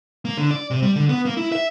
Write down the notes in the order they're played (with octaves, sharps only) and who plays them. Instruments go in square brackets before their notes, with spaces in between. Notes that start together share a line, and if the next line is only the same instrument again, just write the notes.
[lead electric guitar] A#3
D3
D5
C3
G3
D3
B3
A#3
E4
E5